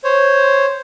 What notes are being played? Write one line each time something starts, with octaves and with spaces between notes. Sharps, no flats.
C5 C#5